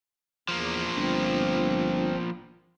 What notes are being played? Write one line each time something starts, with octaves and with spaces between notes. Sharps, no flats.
E2 F3 A#3
G1 C4